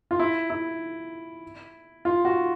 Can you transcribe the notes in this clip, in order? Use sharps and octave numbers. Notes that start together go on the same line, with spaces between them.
F4
E4
E4
F4
F#4